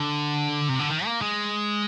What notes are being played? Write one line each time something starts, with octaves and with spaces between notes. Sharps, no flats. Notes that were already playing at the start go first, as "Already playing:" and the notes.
Already playing: D3
C3
D3
D#3
A#3
G#3